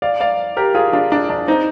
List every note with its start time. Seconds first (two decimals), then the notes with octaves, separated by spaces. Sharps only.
0.02 D5 F5
0.20 D5 F5
0.57 G4 A#4
0.75 F4 G#4
0.93 D4 F4
1.12 D4
1.30 D4
1.48 C4 D#4